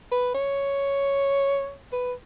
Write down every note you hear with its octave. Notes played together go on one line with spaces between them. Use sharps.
B4
C#5
B4